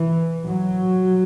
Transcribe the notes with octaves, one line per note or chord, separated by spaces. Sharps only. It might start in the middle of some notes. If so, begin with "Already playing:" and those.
Already playing: E3
F#3